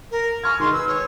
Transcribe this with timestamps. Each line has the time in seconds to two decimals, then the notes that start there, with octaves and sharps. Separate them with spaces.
0.11 A#4
0.44 G#5 C#6 F6 G#6
0.60 D#3 G#3 C6
0.73 B4 E6
0.88 C#5